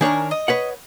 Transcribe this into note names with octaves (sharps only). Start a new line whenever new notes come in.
D#3 D4 A#4 C#5 G#5
D#5
B4 C#5 F#5